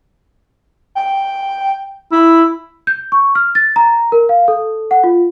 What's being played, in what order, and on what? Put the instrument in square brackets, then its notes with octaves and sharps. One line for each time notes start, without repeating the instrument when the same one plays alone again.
[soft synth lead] G5
[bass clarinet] E4 [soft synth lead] B5
[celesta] G6
C#6
F6
A6
A#5
A#4
F5
A4
F#5
F4